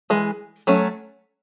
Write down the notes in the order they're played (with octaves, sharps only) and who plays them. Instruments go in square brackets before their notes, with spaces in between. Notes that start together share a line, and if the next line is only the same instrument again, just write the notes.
[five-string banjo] E3 G#3
F#3 A3 C#4